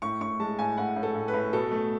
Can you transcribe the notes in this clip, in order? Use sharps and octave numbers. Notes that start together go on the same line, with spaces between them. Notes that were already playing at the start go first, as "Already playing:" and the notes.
A2 C#6
A2 C#6
G#3 A5
A2 G#5
A2 F#5
A2
A4
A2
B4
A2
B2 A4
A3